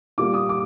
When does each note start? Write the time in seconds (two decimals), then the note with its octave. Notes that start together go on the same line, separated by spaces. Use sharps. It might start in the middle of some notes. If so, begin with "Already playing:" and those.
0.18 A#2 G3 A#3 D6
0.34 D#6
0.49 D6